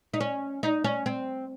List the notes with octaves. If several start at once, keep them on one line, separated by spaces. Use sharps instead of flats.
D#4
C#4
D#4
C#4
C4